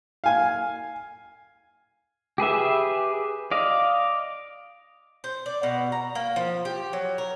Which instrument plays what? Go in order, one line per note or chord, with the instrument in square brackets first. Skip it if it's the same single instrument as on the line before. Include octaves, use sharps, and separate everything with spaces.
[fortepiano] F5 G#5
[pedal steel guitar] G4 G#4 B4 E5
D5 D#5 F5
[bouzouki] C5
D5
B2
A#5
A#3
F3
G4
F#3
A#4